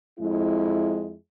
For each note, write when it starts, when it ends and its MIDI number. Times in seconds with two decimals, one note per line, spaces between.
0.19 1.14 41
0.19 1.14 56
0.19 1.14 64